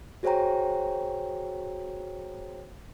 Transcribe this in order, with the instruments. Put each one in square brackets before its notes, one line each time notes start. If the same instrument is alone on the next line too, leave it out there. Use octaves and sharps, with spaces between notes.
[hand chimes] F#4 G#4 C5 C#5 G5 A#5